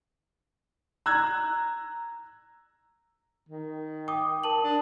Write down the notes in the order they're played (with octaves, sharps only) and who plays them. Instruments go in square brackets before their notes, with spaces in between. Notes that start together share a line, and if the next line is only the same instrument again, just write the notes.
[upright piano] A#5 E6 F#6 G#6
[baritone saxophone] D#3
[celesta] G5 D6 D#6
A#4 A5 F#7
[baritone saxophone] D4